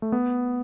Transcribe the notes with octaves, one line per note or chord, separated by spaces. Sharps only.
A3
B3